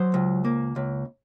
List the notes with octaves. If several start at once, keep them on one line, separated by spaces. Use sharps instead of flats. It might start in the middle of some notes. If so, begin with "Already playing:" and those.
Already playing: F#3 C5
C#2
A#3
C#2